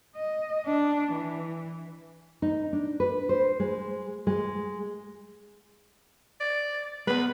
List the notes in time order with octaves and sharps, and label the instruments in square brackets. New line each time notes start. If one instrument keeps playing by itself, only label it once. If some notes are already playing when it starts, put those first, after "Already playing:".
[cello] D#5
D4
E3
[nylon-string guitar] D#4
D4
B4
C5
G#3
G#3
[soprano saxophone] D5
[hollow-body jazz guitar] G#3 B3 [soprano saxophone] B4